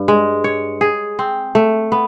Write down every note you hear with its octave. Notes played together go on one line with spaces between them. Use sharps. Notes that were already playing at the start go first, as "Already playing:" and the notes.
Already playing: G2
G#3
C#5
G#4
C4
A3
B3